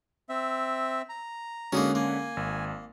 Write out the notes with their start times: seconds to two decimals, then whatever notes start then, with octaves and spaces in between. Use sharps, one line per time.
0.29 C4 E5
1.09 A#5
1.72 D3 G#3 A#3 C#4 D#4 F#4
1.95 A#3 G#5
2.37 G#1